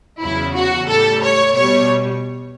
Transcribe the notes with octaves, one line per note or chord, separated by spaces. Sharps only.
E2 C#3 F#3 E4
F#4
A2 G3 A4
C#5
B2 G3 C#5